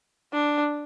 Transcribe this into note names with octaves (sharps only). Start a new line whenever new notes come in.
D4